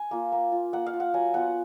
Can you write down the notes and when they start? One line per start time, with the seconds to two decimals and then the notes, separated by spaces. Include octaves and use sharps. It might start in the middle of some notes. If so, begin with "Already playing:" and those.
Already playing: G#5
0.11 A#3 F4
0.32 A#3
0.52 F4
0.73 A#3 F#5
0.86 F5
0.93 F4
1.00 F#5
1.14 F#3 G#5
1.34 B3 F4 F#5